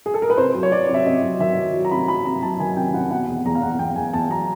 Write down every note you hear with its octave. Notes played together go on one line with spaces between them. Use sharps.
G#4
A4
A#4
B4
C3 C5
F#3
C#5
F#3 D5
C3
E5
C3 D#5
F#3
D#3 E5
F#3
F#3
A#5
C3 B5
F#3 B5
C3 A#5
F#3 A5
D#3 G#5
C3 G5
C3 F#5
B2 F#5
E2
E2 A#5
F5
E2 F#5
E2 G5
E2 G#5
E2 A5
F#3 A#5